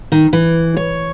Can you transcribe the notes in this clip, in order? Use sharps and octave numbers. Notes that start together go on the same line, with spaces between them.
D#3
E3
C#5